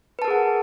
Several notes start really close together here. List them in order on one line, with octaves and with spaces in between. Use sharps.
B4 A5 A#4 G#4 F#5